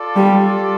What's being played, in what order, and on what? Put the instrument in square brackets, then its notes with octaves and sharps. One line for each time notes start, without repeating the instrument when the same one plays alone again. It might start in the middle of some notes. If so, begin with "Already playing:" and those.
Already playing: [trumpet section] F4 A4 D5
[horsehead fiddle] G3